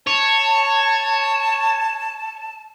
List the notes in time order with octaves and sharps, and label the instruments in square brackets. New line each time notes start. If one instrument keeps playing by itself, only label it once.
[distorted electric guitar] C#5 [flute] A5